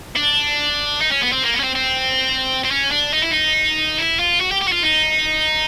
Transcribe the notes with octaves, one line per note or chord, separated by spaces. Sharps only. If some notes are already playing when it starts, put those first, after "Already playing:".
D4
D#4
C#4
B3
C4
A#3
B3
C#4
C4
C4
C4
C#4
D4
D#4
E4
D#4
E4
F4
F#4
G4
G4
F#4
F4
D#4